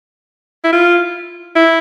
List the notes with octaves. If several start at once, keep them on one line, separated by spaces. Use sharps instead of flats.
E4
F4
E4